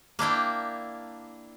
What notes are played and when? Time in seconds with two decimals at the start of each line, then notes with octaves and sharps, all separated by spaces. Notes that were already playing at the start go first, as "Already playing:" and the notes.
0.19 A#3 D4 E4 G5